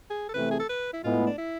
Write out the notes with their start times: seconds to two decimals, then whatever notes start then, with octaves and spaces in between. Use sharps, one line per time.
0.10 G#4
0.29 A4
0.34 C3 E3 A3 B4
0.51 G#4
0.60 A4
0.69 B4
0.93 E4
1.03 A2 G#3 B3 E4 F4
1.27 D4
1.38 E4